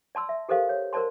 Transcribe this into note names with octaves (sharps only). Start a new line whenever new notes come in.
D5 A5 C6 E6
E5
G4 A4 A#4 C5 D#5 F5
C#5
A#4 C5 D5 A5 C6